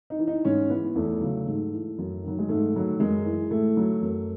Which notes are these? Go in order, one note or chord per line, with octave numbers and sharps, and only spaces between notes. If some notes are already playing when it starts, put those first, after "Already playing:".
D#4
E3
D#4
G#2 C#4
E3 B3
E2 A3
C#3 F#3
G#2
E3
F#2
D#3 F#3
G#3
G#2 A3
D#3 F#3
F#2 G#3
E3
A2 A3
F#3
F#2